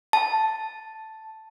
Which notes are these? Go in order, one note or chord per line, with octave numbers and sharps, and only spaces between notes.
A5